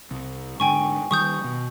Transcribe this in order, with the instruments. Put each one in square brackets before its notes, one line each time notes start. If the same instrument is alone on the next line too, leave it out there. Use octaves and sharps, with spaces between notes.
[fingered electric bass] C2
[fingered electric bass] G#2 D3 [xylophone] G5 G#5 C#6
[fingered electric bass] D#3 G3 [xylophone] C#6 D#6 G6
[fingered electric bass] B2